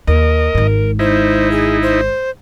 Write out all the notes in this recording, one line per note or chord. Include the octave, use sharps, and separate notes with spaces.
D#2 A#4 D#5
G#1 G#2
D#4 E4 C5
G#4
C5